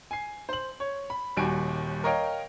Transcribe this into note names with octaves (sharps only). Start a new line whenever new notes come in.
G#5 C7
C5 F#7
C#5
B5
D#1 D#2 G3 F#4 G#5 D7
A#4 C#5 D#5 F5 G5